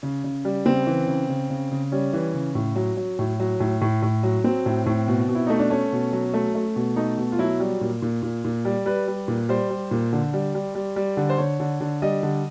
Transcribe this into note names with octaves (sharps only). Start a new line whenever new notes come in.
C#3
C#3
G3
C#3 C4
E3
C#3
C#3
C#3
C#3
G3 C#4
E3
C#3
A2
F#3
F#3
A2
F#3
A2
A2
A2
F#3
F#3 C4
A2
A2
B2
B2
E4
A3 D#4
D4
A3 C#4
B2
F#3
A3
A3
B2
A3 D#4
B2
F4
F#3 E4
G3
A#2
A#2
A#2
A#2
G3
G3 B4
G3
A#2
G3 C5
G3
A#2
D3
G3
G3
G3
G3
D3
C5
D3 C#5
D3
D3
G3 D#5
D3